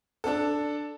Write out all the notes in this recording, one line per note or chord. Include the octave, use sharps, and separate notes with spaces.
D4 A4